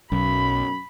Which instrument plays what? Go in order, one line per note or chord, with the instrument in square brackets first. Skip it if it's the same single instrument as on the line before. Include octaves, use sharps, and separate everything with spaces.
[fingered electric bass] B1 [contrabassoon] F#2 [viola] B5